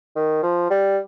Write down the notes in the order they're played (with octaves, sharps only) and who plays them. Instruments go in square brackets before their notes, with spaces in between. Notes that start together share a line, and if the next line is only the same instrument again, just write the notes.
[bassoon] D#3
F3
G3